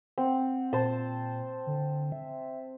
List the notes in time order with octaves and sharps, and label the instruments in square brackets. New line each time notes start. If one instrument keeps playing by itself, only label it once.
[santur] C4 [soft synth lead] F#5
[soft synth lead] A#2 [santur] C5 A5
[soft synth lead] D3
E5